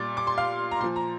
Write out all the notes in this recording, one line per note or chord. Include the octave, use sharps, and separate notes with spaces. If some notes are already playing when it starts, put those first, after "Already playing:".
Already playing: A#2 G3 D6 A6
D6
C6
F5
A#5
A#2 F3 C6
A#5